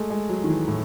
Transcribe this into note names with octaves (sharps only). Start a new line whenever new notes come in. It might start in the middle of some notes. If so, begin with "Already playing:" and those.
Already playing: G#3 A3
G#3
F#3
D#3
E3
A2